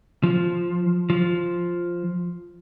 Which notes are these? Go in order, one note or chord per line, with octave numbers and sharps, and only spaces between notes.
F3
F3